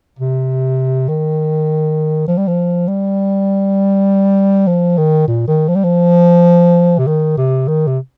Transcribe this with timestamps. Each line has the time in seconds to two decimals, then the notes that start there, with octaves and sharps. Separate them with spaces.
0.19 C3
1.09 D#3
2.28 F3
2.38 G3
2.48 F3
2.88 G3
4.67 F3
4.98 D#3
5.28 A#2
5.47 D#3
5.68 F3
5.75 G3
5.84 F3
6.98 C3
7.07 D#3
7.38 C3
7.68 D#3
7.87 C3